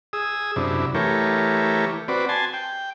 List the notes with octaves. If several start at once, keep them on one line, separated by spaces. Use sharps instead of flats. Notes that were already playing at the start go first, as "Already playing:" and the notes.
G#4 D#6 E6
F#2 C3 D4 E4
E3 A3 G4 A#4 C#5
C4 F#4 B4 D5
G#5 A5 C6
G5